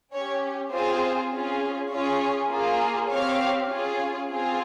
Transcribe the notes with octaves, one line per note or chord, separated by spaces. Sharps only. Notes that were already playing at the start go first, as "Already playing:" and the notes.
C#4 G4 C#5
C4 F4 G#4 C5
C#4 F4 G#4
C#4 F4 G#4 C#5
A#3 F4 G#4
C4 G4 C#5 F5
C#4 F4 G#4
C4 F4 G#4